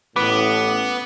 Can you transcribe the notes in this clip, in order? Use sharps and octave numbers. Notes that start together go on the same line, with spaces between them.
A1 A2 B3 B4 D6